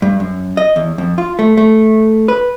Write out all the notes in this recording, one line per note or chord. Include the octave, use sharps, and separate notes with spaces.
G2
F#2
D#5
E2
F2
F4
A3
A3
B4